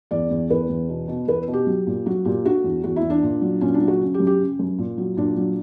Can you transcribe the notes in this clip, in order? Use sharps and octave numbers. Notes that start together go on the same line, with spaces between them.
E2 D5
E2
E2 B4
E2
B2
B2
E2 B4
B2
G4
F#3
A#2
F#3 F#4
A#2 G4
D3 F#4
E2
E2 F#4
E4
E2
D4
A#2
F#3
A#2 C#4
D4
F#3
F#4
C#3
G4
F#2
G4
C#3
F#2
A#2
F#3
A#2 D4
F#3